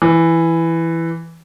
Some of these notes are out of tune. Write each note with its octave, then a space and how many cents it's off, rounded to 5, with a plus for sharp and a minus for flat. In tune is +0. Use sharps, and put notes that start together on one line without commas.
E3 +5